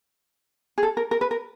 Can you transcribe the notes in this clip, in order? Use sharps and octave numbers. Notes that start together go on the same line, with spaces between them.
G#4
A4
A#4
A#4
B4
A#4